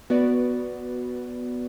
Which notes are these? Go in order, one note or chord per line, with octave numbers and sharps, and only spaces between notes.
B3 F#4 B4 D5